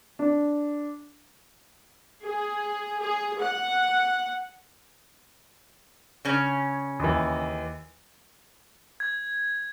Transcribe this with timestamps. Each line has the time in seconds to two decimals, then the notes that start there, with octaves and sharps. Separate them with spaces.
0.19 D4
2.23 G#4
3.00 G#4
3.40 F#5
6.25 C#3 C#4
7.00 D#2 E3
9.00 G#6